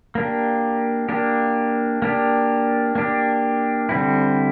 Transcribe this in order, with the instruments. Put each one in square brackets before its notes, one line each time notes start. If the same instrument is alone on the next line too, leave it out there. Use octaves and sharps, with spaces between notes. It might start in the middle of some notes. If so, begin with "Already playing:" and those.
[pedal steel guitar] A#3 D4 G4
A#3 D4 G4
A#3 D4 G4
A#3 D4 G4
D3 G3 C4 E4